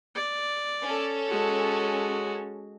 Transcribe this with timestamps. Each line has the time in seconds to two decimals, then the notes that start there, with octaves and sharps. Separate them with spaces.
0.15 D5
0.82 C#4 A4
1.28 G#3 F#4